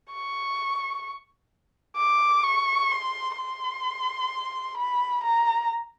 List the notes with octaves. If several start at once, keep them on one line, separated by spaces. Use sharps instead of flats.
C#6
D6
C#6
C6
C6
B5
A#5